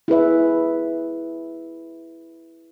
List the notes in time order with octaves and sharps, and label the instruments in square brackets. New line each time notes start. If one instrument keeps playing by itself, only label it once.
[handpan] E4 G#4 B4 E5